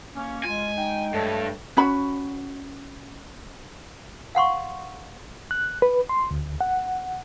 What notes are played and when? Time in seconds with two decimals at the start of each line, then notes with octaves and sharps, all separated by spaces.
0.15 A#3 C#4
0.44 G#3 F4 G#5
0.76 D#4 G5
1.14 G2 A3 C#5 G5 A5
1.77 C#4 F#4 B5
4.35 F5 F#5 C6 C#6
5.51 F#6
5.82 B4
6.09 C6
6.31 D2
6.61 F#5